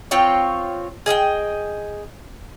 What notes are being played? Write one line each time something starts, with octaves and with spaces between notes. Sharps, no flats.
C4 F4 C#5 G5
G#4 D#5 F5 G5